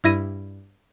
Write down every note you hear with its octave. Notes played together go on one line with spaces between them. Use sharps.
G2 E4 A#6 D#7